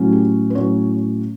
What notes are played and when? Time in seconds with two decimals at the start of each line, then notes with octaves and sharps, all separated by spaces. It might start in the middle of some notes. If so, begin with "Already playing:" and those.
Already playing: A2 F#3 C#4
0.12 G4
0.50 B4
0.55 A2 F#3 C#4 C#5